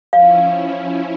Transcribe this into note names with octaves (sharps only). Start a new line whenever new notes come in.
F3 C#4 E4 F5